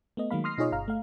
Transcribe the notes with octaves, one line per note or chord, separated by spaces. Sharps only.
A3 B3 D#5
D#3 F#3 G#3 A#3 F5 B5
C6 D#6 F6 A#6 C7
B2 D#4 F4 G#4 C#5 D#5
G1 F5 A#5 F6
A3 F5